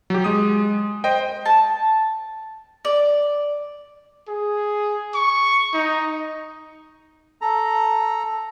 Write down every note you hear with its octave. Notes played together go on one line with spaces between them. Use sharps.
F#3 G4
G#3 D#6
C5 D#5 G5
A5
D5
G#4
C#6
D#4
A4 A#5